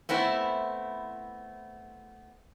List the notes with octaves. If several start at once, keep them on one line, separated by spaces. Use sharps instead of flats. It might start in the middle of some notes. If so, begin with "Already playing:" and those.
A3 B3 C4 E4